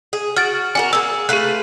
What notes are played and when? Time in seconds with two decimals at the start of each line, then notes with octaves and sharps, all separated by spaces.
0.13 G#4
0.36 F#4 F6 A6 D7
0.75 D4 F#4 A#4 G#5
0.93 A#3 G#4 E6
1.29 A3 F4 G#4 B4 F#6